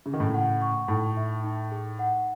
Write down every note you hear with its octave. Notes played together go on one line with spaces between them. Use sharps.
C#3 G#4
D#3
A2 C#3
F#5
C#6
A2 D#4
E5
D#4
G#4
F#5